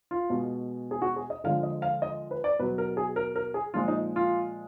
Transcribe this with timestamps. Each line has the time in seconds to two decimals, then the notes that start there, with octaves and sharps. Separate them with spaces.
0.11 F4
0.30 B2 G#3
0.91 G#4
1.02 F#4
1.16 G#4
1.30 D#5
1.44 D3 F3 G#3 F5
1.63 D#5
1.82 F5
2.02 D#5
2.31 B4
2.44 D5
2.60 B2 F#3 B4
2.78 A#4
2.97 G#4
3.16 A#4
3.36 A#4
3.54 G#4
3.74 A#2 F3 G#3 F4
3.88 D#4
4.16 F4